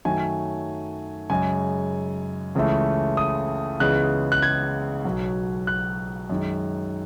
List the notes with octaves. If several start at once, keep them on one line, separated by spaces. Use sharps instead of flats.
F#2 D#3 F#3 A3 G#5
F#2 C#3 G#3 G#5
C#2 C#3 E3 A3
D#6
C#2 C#3 E3 G#3 B3 F#6
F#6
G#6
B1 B2 F#3
F#6
F#2 D#3 G#3